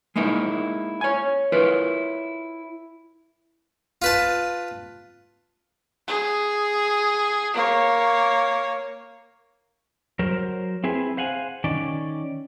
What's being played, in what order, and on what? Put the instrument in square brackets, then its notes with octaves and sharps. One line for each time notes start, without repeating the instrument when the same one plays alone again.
[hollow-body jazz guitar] G#3 A#3 D#4 E4 A#4
C#5 G#5
E4 F4 A#4 B4 C#5
[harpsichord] F4 B4 A5
[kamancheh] G#4
A#3 C#5
[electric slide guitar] F#3 A#4 C5
C4 E4 G#4 B4
C5 F5 F#5 G#5
D#3 C#4 D5